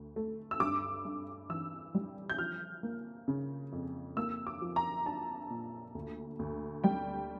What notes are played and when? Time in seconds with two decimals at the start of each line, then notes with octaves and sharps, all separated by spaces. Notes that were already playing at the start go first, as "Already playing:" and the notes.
Already playing: D2
0.16 A3
0.51 E6
0.60 G2 D6
1.05 G2
1.49 E3 E6
1.95 G3
2.30 G6
2.38 F3 F6
2.83 A#3
3.28 C#3
3.72 F2
4.17 A#3 E6
4.47 D6
4.62 F3
4.76 A#5
5.06 D4 A5
5.50 A#2
5.95 D2
6.39 D2
6.84 G3 G5